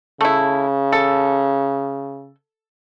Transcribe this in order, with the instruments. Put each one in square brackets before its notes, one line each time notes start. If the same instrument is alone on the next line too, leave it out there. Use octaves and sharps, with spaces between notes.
[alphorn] C#3 [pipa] A3 E4
[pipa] A4